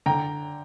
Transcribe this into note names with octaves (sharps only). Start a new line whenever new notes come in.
D3 G5 A#5